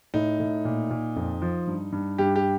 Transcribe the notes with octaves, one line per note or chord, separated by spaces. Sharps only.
A2 D#4
A2
A#2
A#2
F2
F3
G2
G2
G2 G4
G4